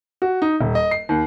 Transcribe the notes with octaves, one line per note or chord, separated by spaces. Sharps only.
F#4
D#4
D#1
D#5
C7
D#2